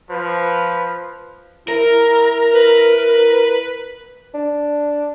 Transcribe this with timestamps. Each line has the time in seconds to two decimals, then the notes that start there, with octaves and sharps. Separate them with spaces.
0.10 F3 B4
1.68 E4 A#4 A#5
2.54 B4
4.34 D4